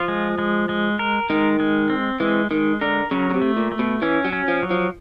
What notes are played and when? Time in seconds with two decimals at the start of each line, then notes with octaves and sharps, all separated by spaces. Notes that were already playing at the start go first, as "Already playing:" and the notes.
Already playing: F3 F4
0.08 G#3
0.38 G#3
0.69 G#3
0.99 A#4
1.30 D#3 G#3
1.60 G#3
1.90 C4
2.20 E3 G#3
2.51 D#3 G#3
2.81 D3 A#4
3.11 C#3 F#3
3.30 C#3
3.34 C3
3.42 A3
3.57 A#2
3.72 A3
3.79 B2
4.02 E3 C#4
4.25 F#3
4.33 C#4
4.48 F3
4.63 F#3
4.71 F3